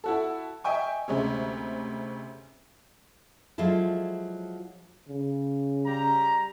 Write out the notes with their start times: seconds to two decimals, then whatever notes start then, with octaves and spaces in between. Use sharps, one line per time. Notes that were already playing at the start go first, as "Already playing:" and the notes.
0.04 E4 F#4 A4
0.64 D#5 E5 G5 G#5 C#6
1.08 D2 C3 G#3 C#4
3.58 F3 F#3 G#3 E4 A4
5.09 C#3
5.86 G3 G4 A#5